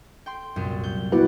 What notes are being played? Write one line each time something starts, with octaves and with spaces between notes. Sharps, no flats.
G5 C6
C2 F#2 A#2
G6
B3 E4 F#4 D5 F#5